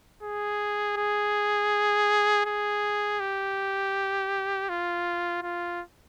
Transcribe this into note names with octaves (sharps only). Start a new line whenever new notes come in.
G#4
G#4
G#4
G4
F4
F4